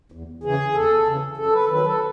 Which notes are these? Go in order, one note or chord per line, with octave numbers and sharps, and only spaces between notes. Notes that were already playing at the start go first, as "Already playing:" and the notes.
E2
C#3 E3 G#4
E2 A4
C#3 E3
F#2 A4
B4
A4
D#3 F#3 B4
A4